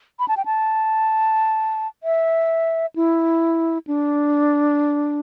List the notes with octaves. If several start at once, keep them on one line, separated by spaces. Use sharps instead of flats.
B5
A5
G5
A5
E5
E4
D4